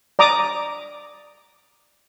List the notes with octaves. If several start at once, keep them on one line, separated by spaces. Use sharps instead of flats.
D5 A#5 D6 D#6